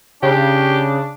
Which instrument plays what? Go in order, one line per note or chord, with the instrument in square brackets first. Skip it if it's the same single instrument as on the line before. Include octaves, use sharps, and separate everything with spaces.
[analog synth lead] C#3 [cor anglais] D4 [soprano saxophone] G4